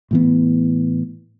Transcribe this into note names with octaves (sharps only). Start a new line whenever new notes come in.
A2 E3 B3